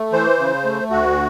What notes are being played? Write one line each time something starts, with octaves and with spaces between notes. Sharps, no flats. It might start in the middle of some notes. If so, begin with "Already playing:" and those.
Already playing: A3
E3 C5
C#3
A3
D2 F#4